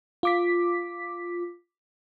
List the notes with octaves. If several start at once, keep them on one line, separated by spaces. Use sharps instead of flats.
F4 D6 B6